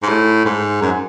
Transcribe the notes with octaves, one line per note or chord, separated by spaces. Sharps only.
G#2
A2
G#2
F#2